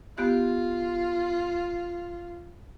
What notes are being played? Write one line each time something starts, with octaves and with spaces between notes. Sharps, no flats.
B3 F4 G4 F#6